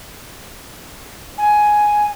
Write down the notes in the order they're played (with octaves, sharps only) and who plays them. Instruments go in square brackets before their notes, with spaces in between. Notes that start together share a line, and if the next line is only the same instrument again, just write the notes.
[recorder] G#5